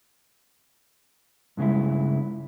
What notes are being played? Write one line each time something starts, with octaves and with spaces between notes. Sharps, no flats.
G2 C#3 G#3 E4